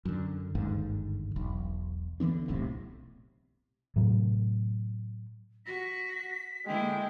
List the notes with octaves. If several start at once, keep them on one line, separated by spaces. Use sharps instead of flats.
F#2 D3
G1 D#2 G#2 D3
E1 B1
D3 E3 B3 D4
D1 B1 A2 C3
A2 C3 F#3
F#4 A#6 B6
D3 G#3 A#3 E4 G5